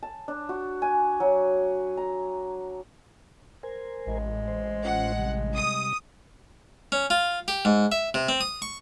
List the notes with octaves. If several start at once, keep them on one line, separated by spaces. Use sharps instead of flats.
A5
D4
F#4
G#5
F#3
A#5
A#4 C5 G#5
A1 G#3
C5
C#4 F4 C5 F#5
C3 G3
D#6
C#4
F4
G4
G#2
E5
C3
C4
D#6
C#6